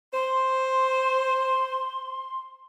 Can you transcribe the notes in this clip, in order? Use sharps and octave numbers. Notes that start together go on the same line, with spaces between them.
C5 C6